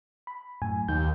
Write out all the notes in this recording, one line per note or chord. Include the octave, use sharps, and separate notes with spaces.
B5
F#2 A2 G#5
D#2 G6